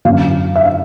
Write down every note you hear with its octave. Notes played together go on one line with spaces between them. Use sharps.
F#2 D3 F#3 F5
E5
F5